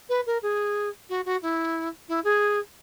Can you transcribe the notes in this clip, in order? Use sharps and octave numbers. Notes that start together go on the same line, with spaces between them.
B4
A#4
G#4
F#4
F#4
E4
E4
G#4